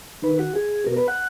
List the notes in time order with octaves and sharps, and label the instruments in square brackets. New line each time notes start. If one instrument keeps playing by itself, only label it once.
[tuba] D#3 [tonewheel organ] B4
[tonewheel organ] F#4
G#4
[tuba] B2 [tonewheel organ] A#4
[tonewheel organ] B4
F#5